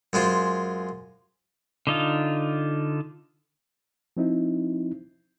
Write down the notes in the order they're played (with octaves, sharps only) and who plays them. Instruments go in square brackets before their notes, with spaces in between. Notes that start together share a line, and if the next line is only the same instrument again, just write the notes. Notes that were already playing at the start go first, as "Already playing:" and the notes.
[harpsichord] F#2 G#3 F4 C5
[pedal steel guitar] D3 D#4 F4
[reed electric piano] F3 C4 D#4 E4